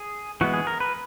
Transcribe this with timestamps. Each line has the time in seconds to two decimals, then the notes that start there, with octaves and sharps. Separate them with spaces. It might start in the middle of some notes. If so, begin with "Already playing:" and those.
Already playing: G#4
0.41 E3 G#3 B3 F#4
0.54 G#4
0.67 A#4
0.80 B4